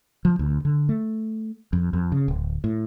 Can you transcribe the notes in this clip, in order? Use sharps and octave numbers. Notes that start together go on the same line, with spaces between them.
F3
D2
D3
A3
F2
F2
C#3
D1
A2